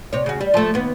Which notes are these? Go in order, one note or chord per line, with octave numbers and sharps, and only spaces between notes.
C3 C#5
C#3 F#4
G3
F3 A3
D#2 B3